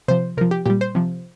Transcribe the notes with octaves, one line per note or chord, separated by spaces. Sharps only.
C3 F3 C5
C3 F3 A#4
G4
A#2 G3 G4
C5
C3 F3